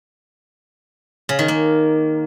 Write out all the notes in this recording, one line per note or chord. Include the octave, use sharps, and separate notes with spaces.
C#3
D#3
A#3